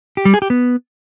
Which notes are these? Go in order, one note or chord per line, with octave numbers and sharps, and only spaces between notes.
G4
G3
G#4
G4
B3